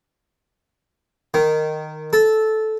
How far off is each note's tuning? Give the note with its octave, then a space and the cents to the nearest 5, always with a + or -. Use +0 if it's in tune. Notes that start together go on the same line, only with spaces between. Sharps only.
D#3 -10
A4 -10